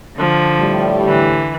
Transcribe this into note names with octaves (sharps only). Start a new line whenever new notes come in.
D3 F3
A2 G3
D3 E3